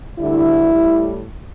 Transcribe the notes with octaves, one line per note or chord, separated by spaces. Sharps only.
D2 D3 G3 E4
A2 G3